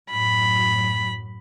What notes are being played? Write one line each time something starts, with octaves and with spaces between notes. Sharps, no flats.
F#2 A2 F#3 B5